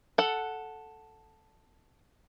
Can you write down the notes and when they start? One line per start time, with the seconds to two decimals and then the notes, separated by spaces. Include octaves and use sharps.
0.18 A4 F#5